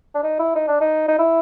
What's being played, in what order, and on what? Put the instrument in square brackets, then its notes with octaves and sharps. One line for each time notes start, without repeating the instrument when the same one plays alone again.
[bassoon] D4
D#4
E4
D#4
D4
D#4
D#4
E4